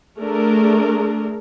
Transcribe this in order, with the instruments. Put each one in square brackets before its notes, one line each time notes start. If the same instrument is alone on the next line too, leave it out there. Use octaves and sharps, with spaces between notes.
[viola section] A3 D4 G#4 A#4